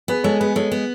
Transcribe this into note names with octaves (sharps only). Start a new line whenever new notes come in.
B3 G#4 B4
G#3 A4 C#5
B3 G#4 B4
G#3 A4 C#5
B3